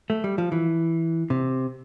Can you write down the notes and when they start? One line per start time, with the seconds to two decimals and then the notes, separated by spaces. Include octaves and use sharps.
0.10 A3
0.24 G3
0.38 F3
0.52 E3
1.30 C3